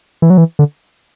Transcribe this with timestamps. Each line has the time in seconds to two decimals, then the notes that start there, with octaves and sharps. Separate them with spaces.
0.22 E3
0.30 F#3
0.38 E3
0.59 D3